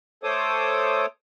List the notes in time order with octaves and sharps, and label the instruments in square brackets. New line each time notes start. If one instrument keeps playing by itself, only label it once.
[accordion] A3 A4 C5 C#5 D6 D#6